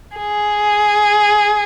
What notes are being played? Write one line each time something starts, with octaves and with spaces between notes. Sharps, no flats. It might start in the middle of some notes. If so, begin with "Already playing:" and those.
G#4